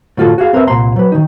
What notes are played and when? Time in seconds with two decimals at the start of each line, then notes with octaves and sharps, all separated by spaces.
0.17 A2 D3 F4 F#4 A4
0.38 F#4 G#4 F5
0.53 C4 A#4 B4 E5
0.67 C2 A#2 A#5 C6
0.96 F#3 B4
1.12 D#3 D#4